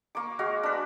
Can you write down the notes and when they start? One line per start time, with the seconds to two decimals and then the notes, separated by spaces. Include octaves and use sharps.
0.15 A#3 C#6 D6
0.39 G#3 F#4 F5
0.63 D4 B4